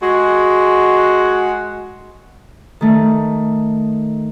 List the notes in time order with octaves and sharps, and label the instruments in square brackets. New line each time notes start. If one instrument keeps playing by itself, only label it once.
[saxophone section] G#3 F#4
[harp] D#3 A3